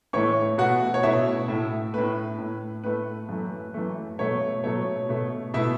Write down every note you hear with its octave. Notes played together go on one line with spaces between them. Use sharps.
A2 E3 A3 C#5 C#6
B2 A3 F#4 F#5
C#5
B2 A3 E4 E5
A2 A3
A2 A3 B4
A2 A3
A2 A3 B4
F#2 E3 A3
F#2 E3 A3
B2 F#3 A3 C#5
B2 F#3 A3 C#5
B2 A3
B2 A3 E4 E5